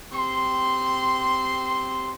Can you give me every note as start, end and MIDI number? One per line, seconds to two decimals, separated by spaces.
0.12 2.13 60
0.12 2.13 67
0.12 2.13 84